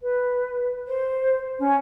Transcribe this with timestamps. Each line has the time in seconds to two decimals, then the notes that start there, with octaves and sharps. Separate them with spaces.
0.02 B4
0.87 C5
1.59 C#4